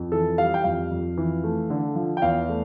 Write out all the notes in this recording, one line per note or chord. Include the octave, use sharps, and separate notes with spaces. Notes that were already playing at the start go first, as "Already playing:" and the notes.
Already playing: F2
E3 A4
G3 F5
G5
F2 F5
F2
E3
A3
D3
F3
G5
E2 F5
A3